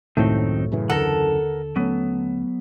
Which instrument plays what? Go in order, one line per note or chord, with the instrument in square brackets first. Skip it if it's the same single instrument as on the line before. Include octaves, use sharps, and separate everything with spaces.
[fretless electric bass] F#1 C#2 F#3 [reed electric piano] A2 A3 [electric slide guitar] D#3 C4 D#4
[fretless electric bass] F#2 C#3 E3
[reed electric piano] D#2 D3 [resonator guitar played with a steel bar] A4 [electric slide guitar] A#4 F#5
[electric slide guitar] F#3 B3 [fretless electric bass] A3 C#4